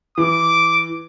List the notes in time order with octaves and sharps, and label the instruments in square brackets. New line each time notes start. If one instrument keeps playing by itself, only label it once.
[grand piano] E3 [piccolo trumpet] D6